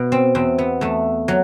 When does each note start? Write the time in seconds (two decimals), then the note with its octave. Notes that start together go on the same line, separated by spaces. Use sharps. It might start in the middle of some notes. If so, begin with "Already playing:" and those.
Already playing: B2
0.12 C4
0.35 E2 C4
0.58 B3
0.81 E2 A3
1.28 F#3